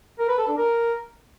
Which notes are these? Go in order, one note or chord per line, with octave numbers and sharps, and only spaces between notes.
A#4
B4
A4
D4
A#4